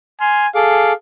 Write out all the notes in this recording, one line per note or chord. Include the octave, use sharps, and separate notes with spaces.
G#5 C6 F6
G#4 A4 F5 D6